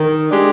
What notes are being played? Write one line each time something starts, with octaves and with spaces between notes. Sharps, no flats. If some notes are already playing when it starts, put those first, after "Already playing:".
Already playing: D#3
G#3 D4 G4